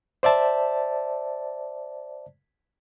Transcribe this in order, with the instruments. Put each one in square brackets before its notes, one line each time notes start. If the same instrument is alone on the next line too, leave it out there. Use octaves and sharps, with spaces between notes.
[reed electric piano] C5 D5 E5 A5